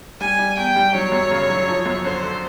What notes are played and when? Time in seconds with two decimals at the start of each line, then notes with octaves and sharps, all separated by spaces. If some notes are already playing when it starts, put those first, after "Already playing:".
0.20 G3 G#5
0.39 G3
0.57 E2 G5
0.76 G3
0.94 F#3 C#5
1.12 F#2
1.31 C#3
1.50 F#3
1.68 F3
1.86 F#2
2.04 D3 C5
2.23 D3